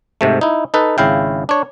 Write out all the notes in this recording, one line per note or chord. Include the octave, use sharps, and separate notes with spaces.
G#2 C3 A3
D#4 E4
D#4 A4 B4
G#1 C#3 E4 F5 G5
D4 C#5